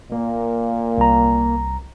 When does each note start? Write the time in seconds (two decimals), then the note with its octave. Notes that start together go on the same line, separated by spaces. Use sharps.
0.12 A#2 A#3
0.98 C2 A#5